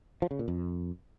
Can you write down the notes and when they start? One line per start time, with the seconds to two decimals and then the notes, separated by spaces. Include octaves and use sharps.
0.22 F3
0.31 C#3
0.39 A#2
0.48 F2